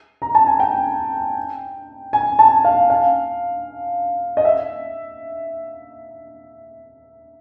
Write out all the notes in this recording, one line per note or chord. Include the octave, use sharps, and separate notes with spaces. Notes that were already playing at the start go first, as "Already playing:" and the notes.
A#5
A5
G#5
G5
G#5
A5
F5
F5
D#5
E5